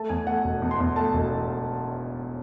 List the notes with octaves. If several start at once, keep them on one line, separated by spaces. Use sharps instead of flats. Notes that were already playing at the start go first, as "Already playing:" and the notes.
Already playing: A3 A5
E2 G#5
A3 F#5
E1
E2
C6
E2
A3 A5
E1
E2